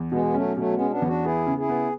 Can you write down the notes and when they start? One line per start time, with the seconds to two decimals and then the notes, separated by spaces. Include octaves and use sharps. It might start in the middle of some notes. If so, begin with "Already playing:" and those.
Already playing: E2
0.12 B2 G#3 B3
0.25 B3
0.34 F#3 A3 C#4
0.57 B2 F#3 A3
0.74 G#3 B3
0.79 C#4
0.90 B3 D4
1.02 E2
1.07 D4 F#4
1.24 B3 E4 G#4
1.47 C#3
1.58 E4 G#4
1.69 B3